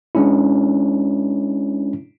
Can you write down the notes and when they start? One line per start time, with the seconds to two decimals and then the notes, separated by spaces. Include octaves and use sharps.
0.15 G#3 C#4 D4 E4